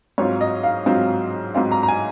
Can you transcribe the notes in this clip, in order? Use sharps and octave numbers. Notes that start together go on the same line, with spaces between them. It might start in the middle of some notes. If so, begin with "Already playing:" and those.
G#2 F#3 C4 F4 C#5
D#5
F5
G#2 F#3 C4 F4
G#2 F#3 C4 F4 F5
A#5
A#5
G#5